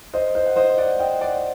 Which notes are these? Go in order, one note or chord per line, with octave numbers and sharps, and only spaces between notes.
C5 D#5
C5 D#5
F#5
C5 D#5
D5 F#5
D#5 G5
D5 F#5